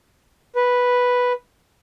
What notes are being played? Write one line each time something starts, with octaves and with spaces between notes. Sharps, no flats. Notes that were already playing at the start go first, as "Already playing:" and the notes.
B4